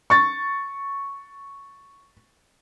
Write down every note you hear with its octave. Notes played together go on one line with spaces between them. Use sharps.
C#6 A6